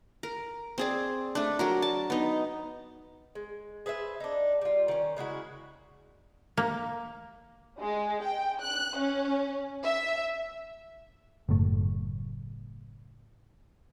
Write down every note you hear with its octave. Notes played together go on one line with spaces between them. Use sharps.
A#4
C4 G#4 D5
A3 D4
F#3 F#4 A#4
A5
B3 D#4
G#3
G#4 B4 C5 E5
D4 D#4
G3 F4
D#3 C#4
C#3 G#3 E4 F#4
A#3
G#3
G5
F#6
C#4
E5
F#1 F#2 A2 A3